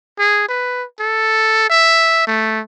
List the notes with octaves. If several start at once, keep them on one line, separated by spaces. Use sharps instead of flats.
G#4
B4
A4
E5
A3